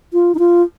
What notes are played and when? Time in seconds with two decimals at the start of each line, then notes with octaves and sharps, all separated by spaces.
0.13 F4
0.35 D#4
0.39 F4